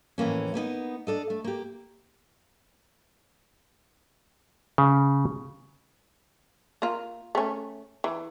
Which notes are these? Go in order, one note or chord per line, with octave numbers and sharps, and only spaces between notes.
F2 A2 E3 A#3 C#4
A#3 B3 C#4 D#4
D4 A4 D#5
A3
A#3 G4
C#3
A#3 F4
A3 C#4
E3